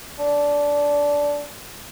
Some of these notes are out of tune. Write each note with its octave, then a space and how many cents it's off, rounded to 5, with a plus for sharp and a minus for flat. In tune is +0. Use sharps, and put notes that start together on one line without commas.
D4 -15